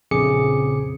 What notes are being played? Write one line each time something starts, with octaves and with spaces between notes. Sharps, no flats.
A#1 F2 C#3 G#4 D6 C#7